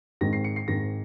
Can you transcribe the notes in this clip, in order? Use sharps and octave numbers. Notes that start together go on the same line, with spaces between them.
G#2 D#3 G#3 C4 A#6
C7
C#7
C7
G#2 D#3 G#3 C4 A#6